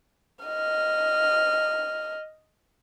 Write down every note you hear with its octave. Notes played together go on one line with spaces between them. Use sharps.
D#5 F6